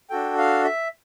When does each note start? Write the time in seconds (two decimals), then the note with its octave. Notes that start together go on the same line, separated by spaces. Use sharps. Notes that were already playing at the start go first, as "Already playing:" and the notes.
0.10 D4 F#4 A4 G5
0.38 F5
0.64 E5